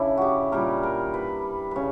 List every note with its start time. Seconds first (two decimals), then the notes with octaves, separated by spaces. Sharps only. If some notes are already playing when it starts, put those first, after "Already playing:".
Already playing: C#3 D4 E4
0.18 F#4 G4
0.52 A#2 G3 A#4
0.83 A#4
1.14 B4
1.71 C#3 B4 C#5